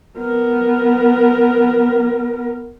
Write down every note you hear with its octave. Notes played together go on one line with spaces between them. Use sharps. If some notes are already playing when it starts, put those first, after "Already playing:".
B3 A#4